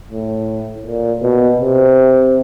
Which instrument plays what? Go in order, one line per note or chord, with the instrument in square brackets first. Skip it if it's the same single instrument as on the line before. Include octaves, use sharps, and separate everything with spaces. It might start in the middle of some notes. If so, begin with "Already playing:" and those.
[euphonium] A2
A#2
B2
C3